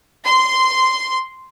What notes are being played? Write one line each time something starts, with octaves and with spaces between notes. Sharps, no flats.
C6